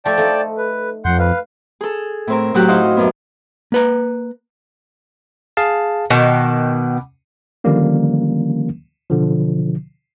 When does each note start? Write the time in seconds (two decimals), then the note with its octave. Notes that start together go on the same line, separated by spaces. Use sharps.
0.05 F3 A3 D5 G5 A5
0.18 A3 D#4 A4
0.58 B4
1.05 F2 F#5 C6 G6
1.19 B4 F5
1.81 G#4 A4
2.27 A2 C4 A#4
2.54 A2 F#3 F#4 G4 F#6
2.68 D#4 E4 F#4 C5 D#5 F5
2.97 F#2 B3
3.72 A#3 B4 A#5
5.57 G#4 F5 A5
6.10 B2 D#3 F#5 D6
7.64 D3 D#3 F3 G3 A#3 C#4
9.10 B2 D3 F3